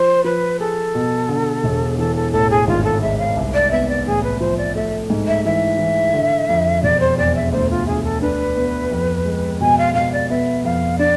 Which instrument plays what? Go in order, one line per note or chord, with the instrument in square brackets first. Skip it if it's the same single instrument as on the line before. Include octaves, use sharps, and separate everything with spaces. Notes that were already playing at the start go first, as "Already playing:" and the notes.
Already playing: [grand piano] F3 [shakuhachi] C5
[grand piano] F3 [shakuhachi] B4
[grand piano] G#4 [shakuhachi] A4
[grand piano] B2
D3
E1
[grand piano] E3 [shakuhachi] A4
[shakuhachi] A4
[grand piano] A1 [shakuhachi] A4
[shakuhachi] G#4
[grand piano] G#1 [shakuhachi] F4
[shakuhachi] A4
[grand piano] G#3 [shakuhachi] E5
[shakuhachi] F5
[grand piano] C2
[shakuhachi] D5
[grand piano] B3 [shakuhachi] E5
[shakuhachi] D5
[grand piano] A1 [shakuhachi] G#4
[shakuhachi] B4
[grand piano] F3 [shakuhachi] C5
[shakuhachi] D5
[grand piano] A3 [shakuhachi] E5
[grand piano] G#2
[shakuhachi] E5
[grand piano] E3 [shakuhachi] E5
[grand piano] E3
D3
F2
[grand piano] E1 [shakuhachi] D5
[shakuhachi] C5
[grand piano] E2 [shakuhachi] D5
[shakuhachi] E5
[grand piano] D2 [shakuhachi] C5
[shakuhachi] F4
[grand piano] D2 [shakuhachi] G#4
[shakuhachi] A4
[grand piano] D4 [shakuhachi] B4
[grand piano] B3
F2
G#3
[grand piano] B2 [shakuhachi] G#5
[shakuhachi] F5
[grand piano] B2 [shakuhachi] F5
[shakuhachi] D5
[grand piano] B3 [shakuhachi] E5
[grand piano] F2 [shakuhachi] F5
[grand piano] D4 [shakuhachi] D5